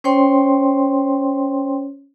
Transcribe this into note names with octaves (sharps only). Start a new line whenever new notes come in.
C#4 C5 C#5 G5 C6